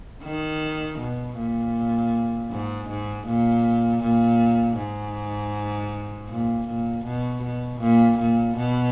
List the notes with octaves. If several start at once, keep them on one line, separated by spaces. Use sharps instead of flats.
D#3
B2
A#2
G#2
G#2
A#2
A#2
G#2
A#2
A#2
B2
B2
A#2
A#2
B2